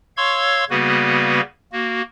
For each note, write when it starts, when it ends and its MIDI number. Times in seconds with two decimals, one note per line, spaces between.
0.17 0.64 73
0.17 0.64 77
0.17 0.64 84
0.17 0.64 85
0.17 0.64 88
0.17 0.64 92
0.70 1.41 49
0.70 1.41 55
0.70 1.41 58
0.70 1.41 59
0.70 1.41 66
0.70 1.41 71
1.73 2.02 58
1.73 2.02 66